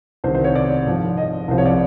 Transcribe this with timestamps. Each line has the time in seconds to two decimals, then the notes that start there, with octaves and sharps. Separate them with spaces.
0.24 C2 C3 D#3 C5
0.35 C5
0.44 C#5
0.55 D5
0.87 G#2 F3
1.17 D#5
1.48 C2 C3 F3 C5
1.58 C#5
1.66 D5